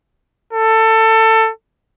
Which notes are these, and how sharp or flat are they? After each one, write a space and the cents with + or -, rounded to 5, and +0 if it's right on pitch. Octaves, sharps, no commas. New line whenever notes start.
A4 +20